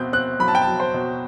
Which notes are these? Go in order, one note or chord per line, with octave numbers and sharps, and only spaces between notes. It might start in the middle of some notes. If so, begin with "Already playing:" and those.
Already playing: B2 C4 G6
C4 F#6
F#3 B5
A5
G5
A5
F#3
C5
B2